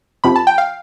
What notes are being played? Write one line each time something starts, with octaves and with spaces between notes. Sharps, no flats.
F2 C3 F3 B5
A5
G5
F5